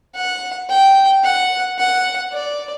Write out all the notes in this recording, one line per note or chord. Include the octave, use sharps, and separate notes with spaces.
F#5
G5
F#5
F#5
D5